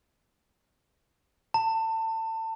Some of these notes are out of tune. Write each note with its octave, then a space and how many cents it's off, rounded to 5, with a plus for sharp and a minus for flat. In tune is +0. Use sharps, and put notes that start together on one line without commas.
A5 +30